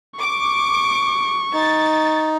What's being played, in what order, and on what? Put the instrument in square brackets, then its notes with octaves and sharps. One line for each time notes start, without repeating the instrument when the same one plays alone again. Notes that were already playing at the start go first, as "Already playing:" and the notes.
[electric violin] C#6 [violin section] D6
[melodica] D#4 [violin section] A6